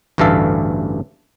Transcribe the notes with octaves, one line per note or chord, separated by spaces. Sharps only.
A1 D2 G2 E3 A4 F5